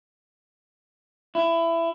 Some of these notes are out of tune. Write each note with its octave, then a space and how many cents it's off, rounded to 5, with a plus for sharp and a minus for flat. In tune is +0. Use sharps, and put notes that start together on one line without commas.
E4 +20